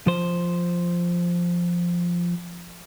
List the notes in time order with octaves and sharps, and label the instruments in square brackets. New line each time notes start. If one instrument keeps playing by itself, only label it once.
[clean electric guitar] F3 C5